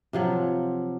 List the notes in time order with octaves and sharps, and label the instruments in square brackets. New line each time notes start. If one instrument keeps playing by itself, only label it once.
[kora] C3 F3 F#3